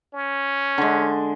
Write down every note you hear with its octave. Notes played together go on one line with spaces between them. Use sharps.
C#4
D3 G#3